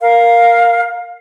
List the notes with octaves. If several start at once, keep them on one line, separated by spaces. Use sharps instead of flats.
A#4 F5